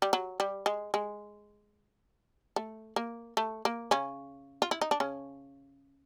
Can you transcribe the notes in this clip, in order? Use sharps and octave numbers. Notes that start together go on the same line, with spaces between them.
G3
F#3
G3
G#3
G#3
A3
A#3
A3
A#3
C#3 C#4
F4
E4
D#4
D4
C#3 C#4